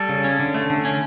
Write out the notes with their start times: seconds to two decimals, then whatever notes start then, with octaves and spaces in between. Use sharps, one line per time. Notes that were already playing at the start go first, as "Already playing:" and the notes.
Already playing: G3 A4
0.09 C#3
0.24 C#4
0.40 D3
0.54 A3
0.70 D3
0.85 C#4